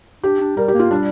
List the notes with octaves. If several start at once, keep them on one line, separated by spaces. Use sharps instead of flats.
D4 G4
D4
G3 A#4
G4
A#3
F4
G3 D4